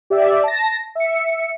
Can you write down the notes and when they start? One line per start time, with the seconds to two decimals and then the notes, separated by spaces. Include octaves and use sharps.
0.10 G4 D5 E5
0.43 A5 A#6
0.95 E5 C#7